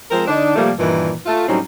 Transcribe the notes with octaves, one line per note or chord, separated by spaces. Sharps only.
F3 G#3 C4 A#4 C5
D3 D4 D#4
C3 F3 G3 A3 A#3
G2 A#2 D#3 E3
A3 F4
A2 F#3 G3 C4 C#4 D#4